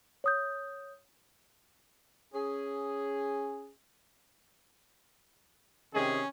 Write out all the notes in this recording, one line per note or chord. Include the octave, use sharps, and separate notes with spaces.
C#5 D#6 G6
C#4 G#4
C3 D#3 C#4 G#4